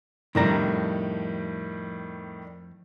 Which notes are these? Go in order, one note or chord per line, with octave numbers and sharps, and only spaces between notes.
F2 A2 D#3 G3 D4 A#5